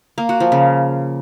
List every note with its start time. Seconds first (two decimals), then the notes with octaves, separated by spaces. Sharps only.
0.18 A#3
0.29 F#4
0.40 F3
0.52 C#3